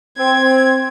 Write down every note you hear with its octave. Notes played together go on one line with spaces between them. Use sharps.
C4 G#6